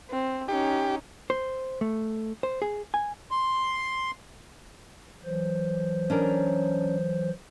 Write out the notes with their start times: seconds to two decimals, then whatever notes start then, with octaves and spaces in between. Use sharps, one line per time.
0.11 C4
0.48 C#4 D#4 G4
1.30 C5
1.81 A3
2.43 C5
2.62 G#4
2.94 G#5
3.31 C6
5.24 E3 F#3 C5
6.10 C#4 D4 A#4